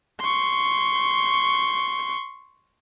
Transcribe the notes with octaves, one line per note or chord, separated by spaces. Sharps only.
C6 C#6